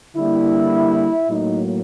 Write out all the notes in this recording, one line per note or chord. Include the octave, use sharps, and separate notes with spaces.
D3 G3 A#3 E4
A2 F#3 A#3 D#4